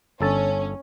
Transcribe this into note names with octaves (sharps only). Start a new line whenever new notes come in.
G1 C#4 A4 A5